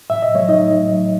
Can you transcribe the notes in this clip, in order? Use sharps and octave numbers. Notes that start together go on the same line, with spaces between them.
A2 E5
D#5
F#3 A3 C#5
D#4 D#5
A2
F#3 A3